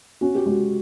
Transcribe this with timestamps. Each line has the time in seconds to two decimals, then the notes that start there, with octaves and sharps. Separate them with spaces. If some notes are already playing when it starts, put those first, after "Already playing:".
0.21 C#4 F#4
0.35 G4
0.46 G#3 F#4